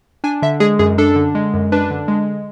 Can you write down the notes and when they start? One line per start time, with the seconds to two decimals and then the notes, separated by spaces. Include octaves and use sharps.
0.24 D4 G#5
0.42 D3 E5
0.60 G#3 G#4
0.79 F#2 G#4
0.98 D4 A4
1.16 D3
1.35 G#3
1.54 F#2
1.72 D4 B4
1.91 D3
2.08 G#3